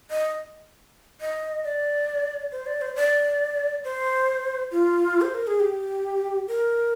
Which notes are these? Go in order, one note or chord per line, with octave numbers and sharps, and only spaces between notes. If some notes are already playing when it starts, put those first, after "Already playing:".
D#5
D#5
D5
C5
D5
C5
D5
C5
F4
C5
A#4
G#4
G4
A#4